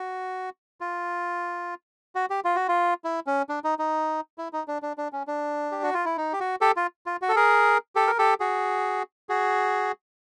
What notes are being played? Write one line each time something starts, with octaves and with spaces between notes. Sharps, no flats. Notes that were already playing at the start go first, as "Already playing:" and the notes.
Already playing: F#4
F4
F#4
G4
F4
F#4
F4
E4
C#4
D4
D#4
D#4
E4
D#4
D4
D4
D4
C#4
D4
G4
F#4
F4
E4
D#4
G4
F#4
G4 A4
F4
F4
F#4
A4
G#4 A#4
G4 A4
A#4
G4 A4
F#4 G#4
F#4 G#4